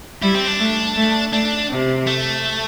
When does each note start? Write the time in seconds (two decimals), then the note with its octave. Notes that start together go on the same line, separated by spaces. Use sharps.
0.22 G3 E4
0.35 C4
0.47 D4
0.59 A3
0.97 A3
1.33 A3 D4
1.70 C3
2.07 A3